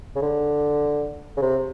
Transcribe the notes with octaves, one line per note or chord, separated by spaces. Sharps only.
C#3
D3
C#3
C3